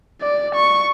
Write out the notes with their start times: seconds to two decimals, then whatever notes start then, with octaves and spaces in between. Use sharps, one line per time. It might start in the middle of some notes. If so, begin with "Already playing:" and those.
0.21 D5
0.55 C#6